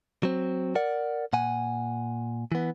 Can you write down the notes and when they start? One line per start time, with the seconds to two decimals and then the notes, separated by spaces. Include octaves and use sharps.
0.23 F#3 C4
0.75 A#4 D5 F#5
1.33 A#2 F#5 G#5
2.52 E3 B3